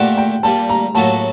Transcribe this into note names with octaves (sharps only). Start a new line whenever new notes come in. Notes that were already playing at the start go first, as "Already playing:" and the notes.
Already playing: A#2 A3 D4 G4 A#4 F#5
G5
A#2 G3 A#3 A5
A#5
A2 F#3 A#3 F#4 A4 A5